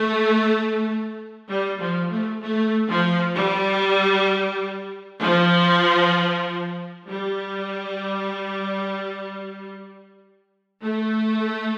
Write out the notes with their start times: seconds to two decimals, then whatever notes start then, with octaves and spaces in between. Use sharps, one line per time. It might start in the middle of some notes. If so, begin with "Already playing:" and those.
Already playing: A3
1.49 G3
1.80 F3
2.11 A3
2.43 A3
2.89 F3
3.36 G3
5.22 F3
7.09 G3
10.83 A3